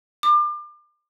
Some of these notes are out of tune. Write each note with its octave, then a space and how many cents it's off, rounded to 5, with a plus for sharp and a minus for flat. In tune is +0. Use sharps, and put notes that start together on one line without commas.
D6 +35